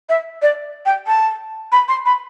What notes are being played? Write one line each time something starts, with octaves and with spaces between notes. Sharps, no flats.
E5
D5
G5
A5
B5
C6
B5